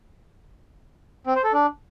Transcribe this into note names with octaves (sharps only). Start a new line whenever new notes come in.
C4
C5
A4
D4